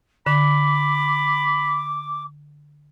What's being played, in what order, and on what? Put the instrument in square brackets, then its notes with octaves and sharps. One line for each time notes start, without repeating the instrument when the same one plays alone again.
[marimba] D3 [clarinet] B5 [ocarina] D6